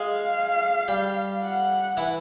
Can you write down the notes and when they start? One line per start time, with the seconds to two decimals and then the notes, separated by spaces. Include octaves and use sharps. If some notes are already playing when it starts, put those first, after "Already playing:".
Already playing: G#3 G#4 F5
0.88 G3 G4
1.43 F#5
1.97 E3 E4